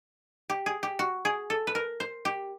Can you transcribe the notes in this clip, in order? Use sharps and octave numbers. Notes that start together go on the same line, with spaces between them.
G4
G#4
G4
F#4
G#4
A4
B4
A#4
C5
G4